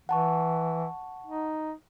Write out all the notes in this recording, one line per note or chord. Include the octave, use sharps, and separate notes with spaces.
E3 F#5 A5 C#6
D#4